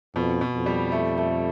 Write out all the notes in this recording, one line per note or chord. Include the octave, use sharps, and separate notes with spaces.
F2 B2
B2
F2
G3
A3
A3